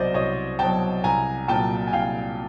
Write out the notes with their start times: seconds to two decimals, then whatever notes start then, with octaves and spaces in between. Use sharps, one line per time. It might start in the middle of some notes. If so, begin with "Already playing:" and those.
Already playing: C2 B2 F#3 C5 D5 D#5
0.14 C2 C#5 D#5
0.59 B2 F#3 G5 A5
1.04 C2 G#5 A#5
1.48 A#2 F#3 G5 A5
1.87 G#5
1.93 C2 F5 G5